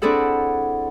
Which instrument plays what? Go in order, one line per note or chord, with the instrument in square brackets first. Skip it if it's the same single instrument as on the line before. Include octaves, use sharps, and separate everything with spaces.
[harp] C4 D4 E4 G#4 A4 F#5